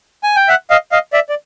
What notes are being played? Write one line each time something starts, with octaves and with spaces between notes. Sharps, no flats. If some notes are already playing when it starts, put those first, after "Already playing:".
G#5
G5
E5 F#5
D#5 F5
D#5 F5
D5 E5
D5